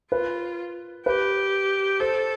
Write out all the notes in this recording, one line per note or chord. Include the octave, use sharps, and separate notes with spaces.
F4 B4
G4 B4
A4 C5